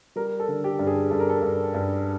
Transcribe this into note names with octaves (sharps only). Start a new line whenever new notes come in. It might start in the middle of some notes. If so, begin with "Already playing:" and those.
G3 A#4
A4
D3
G4
G2
G#4
G2 A4
A#4
A4
G2
G2